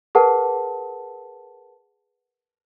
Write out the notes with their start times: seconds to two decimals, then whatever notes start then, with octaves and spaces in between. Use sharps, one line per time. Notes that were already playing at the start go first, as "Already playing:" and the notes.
0.15 G#4 A#4 B4 F#5 A5